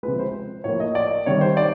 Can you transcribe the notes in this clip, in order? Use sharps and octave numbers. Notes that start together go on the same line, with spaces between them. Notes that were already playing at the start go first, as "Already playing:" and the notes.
C3 F3 G#3 B4
C5
A2 F3 A#3 C#5
D#5
D5
C3 D#3 G3 C#5
C5
D5